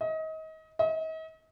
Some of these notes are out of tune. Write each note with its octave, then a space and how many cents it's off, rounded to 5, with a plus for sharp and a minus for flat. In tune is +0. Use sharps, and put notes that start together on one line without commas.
D#5 +30
D#5 +40